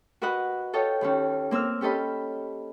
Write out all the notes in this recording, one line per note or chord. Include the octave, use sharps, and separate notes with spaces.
F#4 A#4 B4 D#5 F#5
F4 A4 C#5 D#5 G5
D#2 D#3 C#4
A#3 C4 A#4 E6 F6
C#4 G4 A4 D#5 B5